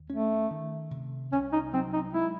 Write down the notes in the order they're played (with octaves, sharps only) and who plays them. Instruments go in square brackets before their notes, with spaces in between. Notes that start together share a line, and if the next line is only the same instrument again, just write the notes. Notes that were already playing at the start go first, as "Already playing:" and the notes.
Already playing: [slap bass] D#2
[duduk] A3 [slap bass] C#4
[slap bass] D#3
C3
[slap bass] C2 [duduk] C#4
[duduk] D#4
[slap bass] F#3 [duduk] C4
[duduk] D#4
[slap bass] G#3 [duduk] E4